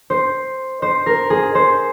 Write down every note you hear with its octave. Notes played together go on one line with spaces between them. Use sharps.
C5
C5
A#4
G#4
C5